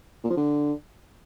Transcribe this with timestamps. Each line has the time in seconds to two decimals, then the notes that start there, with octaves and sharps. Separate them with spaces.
0.24 A#2
0.30 F3
0.37 D3